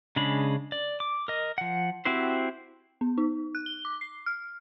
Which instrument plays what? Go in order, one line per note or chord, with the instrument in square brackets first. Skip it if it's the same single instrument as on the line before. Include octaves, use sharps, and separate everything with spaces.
[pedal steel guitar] C#3 G#3 D4 B5
D5
D6
A#4 D#5
F3 F#5
C4 E4 F#4 G4 C5
[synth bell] B3
D#4
F#6
G7
D6
C7
F6